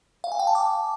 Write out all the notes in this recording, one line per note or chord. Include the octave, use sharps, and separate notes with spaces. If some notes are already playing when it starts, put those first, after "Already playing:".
F5
G#5
G5
A5
D6